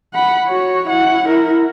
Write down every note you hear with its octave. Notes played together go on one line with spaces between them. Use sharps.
F#5 B5
F#4 C#5
E4 F#5
E4 A#4